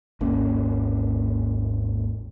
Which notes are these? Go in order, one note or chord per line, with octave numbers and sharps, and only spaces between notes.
G#1 D#2 A#3 C#4